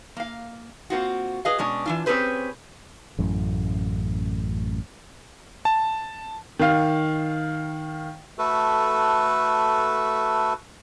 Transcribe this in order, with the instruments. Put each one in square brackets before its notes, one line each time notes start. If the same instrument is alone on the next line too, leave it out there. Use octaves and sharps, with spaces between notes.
[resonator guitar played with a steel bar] A#3 F5
A#3 C4 F4 F#4
G#4 B4 D#5 F5
B2 G#3 C#4 D4
E3 D4 F4
C4 C#4 G4 G#4 B4 C5
[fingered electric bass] A1 F#2 A2
[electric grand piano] A5
[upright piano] D#3 F5
[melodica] A3 F#4 A4 B4